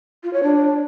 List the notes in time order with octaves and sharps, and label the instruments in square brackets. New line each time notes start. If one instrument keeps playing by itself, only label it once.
[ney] F4
C#5
D4